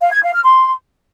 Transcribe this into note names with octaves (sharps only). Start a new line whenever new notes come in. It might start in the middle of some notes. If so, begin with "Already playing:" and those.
F5
G#6
F5
F6
C6